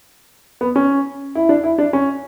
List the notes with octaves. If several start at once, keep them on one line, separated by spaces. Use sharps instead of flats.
B3
C#4
E4
D4
E4
D4
C#4